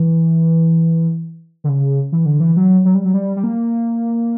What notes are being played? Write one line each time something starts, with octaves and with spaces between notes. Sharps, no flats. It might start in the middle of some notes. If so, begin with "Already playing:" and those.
Already playing: E3
D3
C#3
E3
D3
E3
F#3
F#3
G3
F#3
G3
G3
A#3